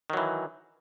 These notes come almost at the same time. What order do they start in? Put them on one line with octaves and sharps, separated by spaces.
D#3 F#3 E3